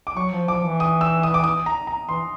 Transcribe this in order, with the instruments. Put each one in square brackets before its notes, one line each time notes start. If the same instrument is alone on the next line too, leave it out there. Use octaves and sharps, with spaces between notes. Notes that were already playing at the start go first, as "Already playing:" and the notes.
[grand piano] D6
[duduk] F#3 [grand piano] C#6
[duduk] F3
[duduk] F3 [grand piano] D6
[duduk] E3
[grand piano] D#6
E6
D#6
D6
D#6
A#5
A#5
[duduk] E3 [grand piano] C6